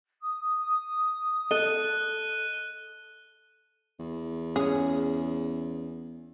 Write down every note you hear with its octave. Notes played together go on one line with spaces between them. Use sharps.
D#6
A4 D#5 F#6 D#7 G7
E2
C#4 G#4